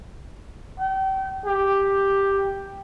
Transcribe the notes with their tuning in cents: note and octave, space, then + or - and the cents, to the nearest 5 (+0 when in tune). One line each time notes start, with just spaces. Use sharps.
G5 -35
G4 +5